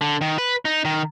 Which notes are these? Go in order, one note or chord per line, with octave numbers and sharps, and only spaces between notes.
D3
D#3
B4
D#4
D#3